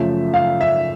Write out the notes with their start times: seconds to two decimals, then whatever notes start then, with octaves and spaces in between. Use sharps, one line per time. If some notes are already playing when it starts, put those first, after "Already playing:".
Already playing: F#2 C#3 F3 A3 E5
0.34 F5
0.61 E5